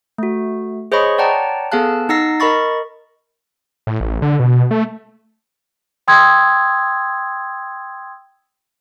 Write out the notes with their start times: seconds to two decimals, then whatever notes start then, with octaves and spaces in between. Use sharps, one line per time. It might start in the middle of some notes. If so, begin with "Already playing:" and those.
0.18 A3 F#4
0.92 G#4 C5 C#5 D#5 B5 C#6
1.18 C#5 D5 F#5 G5 A5 A#5
1.72 B3 G#4 A4 F5 A5 F#6
2.09 D#4 F#5 E6 A#6 C7
2.40 A#4 D#5 B5 C#6 A6
3.87 A2
4.01 A1
4.22 D3
4.39 B2
4.71 A3
6.08 G5 C6 D#6 E6 G#6